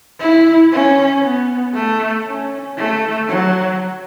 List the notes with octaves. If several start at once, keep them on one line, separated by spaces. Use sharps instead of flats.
E4
C#4
B3
A3
C#4
A3
F#3